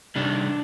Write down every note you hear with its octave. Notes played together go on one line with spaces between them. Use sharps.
C3 D#3 G3 D4